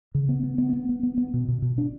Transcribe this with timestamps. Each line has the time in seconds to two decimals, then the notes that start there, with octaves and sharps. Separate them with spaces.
0.15 C#3
0.29 B3
0.43 B3
0.58 B3
0.73 B3
0.89 B3
1.03 B3
1.18 B3
1.34 B2
1.48 B2
1.62 B2
1.78 D4